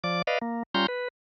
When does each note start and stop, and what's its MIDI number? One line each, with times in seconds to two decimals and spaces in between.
0.04 0.22 53
0.04 0.22 74
0.04 0.22 86
0.27 0.38 71
0.27 0.38 74
0.27 0.38 75
0.27 0.38 77
0.42 0.63 58
0.75 0.87 55
0.75 0.87 61
0.75 0.87 65
0.75 0.87 82
0.75 0.87 84
0.75 0.87 91
0.88 1.08 71